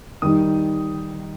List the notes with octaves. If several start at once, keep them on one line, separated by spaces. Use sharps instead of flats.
D#3 G3 D#4 D#6